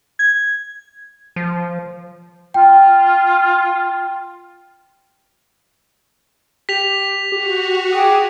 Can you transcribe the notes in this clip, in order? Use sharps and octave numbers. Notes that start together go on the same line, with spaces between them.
G#6
F3
F4 G5
G4 B6 F7
F#4 G4
G#4 G5 D6 D#6